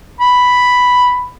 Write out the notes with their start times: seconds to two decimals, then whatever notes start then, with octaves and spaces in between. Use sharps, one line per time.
0.21 B5